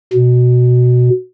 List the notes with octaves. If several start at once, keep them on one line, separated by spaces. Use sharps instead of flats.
B2